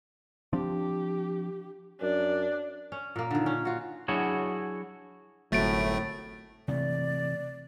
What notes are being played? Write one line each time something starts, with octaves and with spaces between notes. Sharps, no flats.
F3 C4 D4 G4
F#2 D4
C#4
A#2 A#3
D3 D#3
C#4
F4 F#4
F#3 D4 E4 F#4 G#4 C#5
G1 C2 A2 F#3 A3 A6 D7
C3 E3 A3 D5